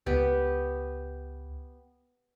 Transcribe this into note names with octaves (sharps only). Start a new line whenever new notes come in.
C#2 B3 G4 G5